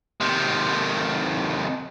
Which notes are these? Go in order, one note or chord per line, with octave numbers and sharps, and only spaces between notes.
C3 D#3